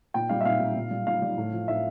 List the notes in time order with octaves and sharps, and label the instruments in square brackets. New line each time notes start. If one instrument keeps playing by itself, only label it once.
[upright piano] A#2 G5
G3 F5
E5
A#2 F5
G3
A#2
G3
A#2 F5
G3
A2
F3
A2 E5